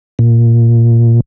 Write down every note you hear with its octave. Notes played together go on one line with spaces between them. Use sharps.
A#2